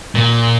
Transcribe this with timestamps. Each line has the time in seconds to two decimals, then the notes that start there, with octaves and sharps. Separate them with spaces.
0.15 A#2